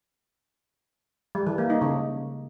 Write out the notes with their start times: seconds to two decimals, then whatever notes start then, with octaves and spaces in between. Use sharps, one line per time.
1.35 G3
1.47 E3
1.58 A#3
1.70 D#4
1.82 C#3